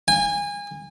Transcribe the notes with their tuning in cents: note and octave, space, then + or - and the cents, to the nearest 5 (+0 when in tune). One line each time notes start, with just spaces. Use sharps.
G#5 -30